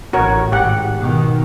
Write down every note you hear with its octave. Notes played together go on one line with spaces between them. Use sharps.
A1 F#4 A#4 C#5
G#1 G4 F#5
B2 D#3